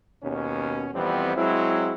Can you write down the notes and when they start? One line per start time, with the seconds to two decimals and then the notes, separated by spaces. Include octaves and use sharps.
0.23 D#2 B2 C#4
0.94 F2 E3 G3 B3 C4
1.36 F#3 G#3 C4 E4